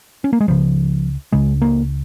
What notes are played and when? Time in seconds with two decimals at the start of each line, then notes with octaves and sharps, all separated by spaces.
0.24 C#4
0.33 A#3
0.40 G#3
0.48 C#2 C#3 F3
1.32 C#2 C#3 G#3
1.62 A#3